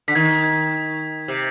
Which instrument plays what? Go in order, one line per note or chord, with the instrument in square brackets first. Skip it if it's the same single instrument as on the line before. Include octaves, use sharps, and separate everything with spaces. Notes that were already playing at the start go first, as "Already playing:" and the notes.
[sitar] D3 [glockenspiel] B6
[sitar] D#3 [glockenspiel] G#6
[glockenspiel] G#6
[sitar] C3